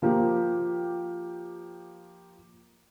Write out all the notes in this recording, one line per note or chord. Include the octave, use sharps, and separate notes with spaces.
F3 A#3 G4